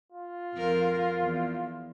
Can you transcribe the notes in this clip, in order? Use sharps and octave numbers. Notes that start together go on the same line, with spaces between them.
F4
F2 C4 A#4
E2